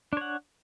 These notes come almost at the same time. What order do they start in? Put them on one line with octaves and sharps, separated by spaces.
D4 C#5 F#5